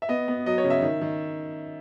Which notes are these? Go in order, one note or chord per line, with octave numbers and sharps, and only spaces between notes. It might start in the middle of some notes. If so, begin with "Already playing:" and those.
E5
B3 D#5
B3
F#3 D#5
C#5
C#3
E5
D#3
D#3